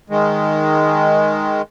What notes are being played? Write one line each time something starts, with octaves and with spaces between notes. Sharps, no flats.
D#3 G#3